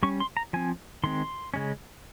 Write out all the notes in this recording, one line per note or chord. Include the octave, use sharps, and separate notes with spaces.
G3 C#4 C#6
C6
A#5
F3 C4 G#5
D#3 G#3 C4 C6
C#3 G#3 C#4